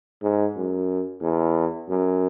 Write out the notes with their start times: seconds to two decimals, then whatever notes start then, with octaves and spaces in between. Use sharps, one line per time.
0.22 G#2
0.56 F#2
1.22 E2
1.89 F#2